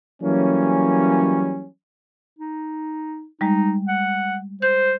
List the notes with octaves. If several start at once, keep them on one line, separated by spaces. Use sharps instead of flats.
E3 F#3 G3 A#3 C#4
D#4
G3 G#3 D#4
F#5
C5 G6